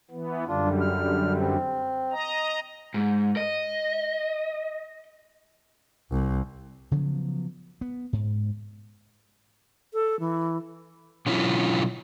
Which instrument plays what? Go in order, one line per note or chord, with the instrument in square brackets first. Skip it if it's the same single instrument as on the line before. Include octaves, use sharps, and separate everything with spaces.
[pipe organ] E3 B3
[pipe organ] F#2 D3 G3 [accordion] D4 F4
[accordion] F6
C4
[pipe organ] D#5 A#5
[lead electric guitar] G#2
D#5
[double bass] C2
[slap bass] C#3 F3 F#3 B3
B3
G#2
[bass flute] A4
E3
[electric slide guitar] B2 D3 F#3 C#4 E4 F4